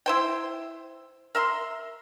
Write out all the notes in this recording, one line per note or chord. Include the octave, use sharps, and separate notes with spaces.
E4 C5 G5
A#4 E5 C6